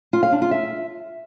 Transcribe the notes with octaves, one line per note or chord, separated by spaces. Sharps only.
F4
F5
D4
F4
E5